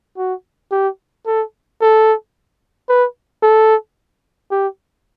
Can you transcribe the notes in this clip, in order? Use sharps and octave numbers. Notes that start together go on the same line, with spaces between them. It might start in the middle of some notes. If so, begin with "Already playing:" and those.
F#4
G4
A4
A4
B4
A4
G4